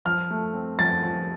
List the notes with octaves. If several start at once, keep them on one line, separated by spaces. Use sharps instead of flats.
F3 F6
A3
C4
F3 A6
F3